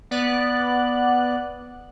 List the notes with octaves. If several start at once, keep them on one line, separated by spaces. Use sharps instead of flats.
B3 D5 F#6